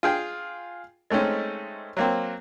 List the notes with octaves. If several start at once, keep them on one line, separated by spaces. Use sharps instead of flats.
F4 G#4 G5
G#3 A3 C4 C#4 D#4
F#3 A#3 C4